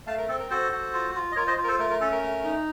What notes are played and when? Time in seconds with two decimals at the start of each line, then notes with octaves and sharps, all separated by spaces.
0.07 A3 F5 A5
0.18 A#4
0.29 C4 A4
0.40 A#4
0.50 F#4 A4 C5
0.72 F#4
0.94 F4
1.15 F4
1.32 D#5
1.36 F4 A#4 C#5
1.47 C5 D#5
1.57 F4
1.64 A#4
1.68 A4 C5
1.79 A3 A#4
1.90 A#4
2.01 C#4 A4
2.12 A#4
2.23 A3
2.44 D#4